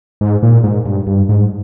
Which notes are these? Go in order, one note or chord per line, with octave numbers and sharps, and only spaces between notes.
G#2
A#2
G#2
G2
G2
G#2